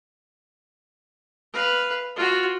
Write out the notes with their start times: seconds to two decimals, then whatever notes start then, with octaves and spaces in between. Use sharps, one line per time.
1.53 B4 F5
2.16 F4 F#4